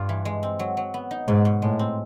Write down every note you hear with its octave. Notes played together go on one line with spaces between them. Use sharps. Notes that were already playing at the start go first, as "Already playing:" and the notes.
Already playing: G2 F4
E3
G#3
C4
F#3
F#3
B3
D#4
G#2 B2
B2
A2 G#3
C4